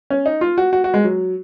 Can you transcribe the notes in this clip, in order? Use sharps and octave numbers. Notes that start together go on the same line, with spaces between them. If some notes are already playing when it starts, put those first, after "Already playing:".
C#4
D#4
F4
F#4
F#4
F#4
G#3
F#3